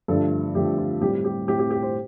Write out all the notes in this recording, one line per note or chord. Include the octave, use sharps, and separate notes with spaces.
G2 D3 F3 A3 A4
G2 D3 F3 A3 G4
F4
A2 G3 C4 G4
G4
A2 G3 C4 G4
G4
G4
C5